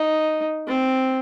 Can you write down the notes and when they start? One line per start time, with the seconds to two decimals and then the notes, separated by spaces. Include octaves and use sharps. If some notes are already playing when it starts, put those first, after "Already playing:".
Already playing: D#4
0.68 C4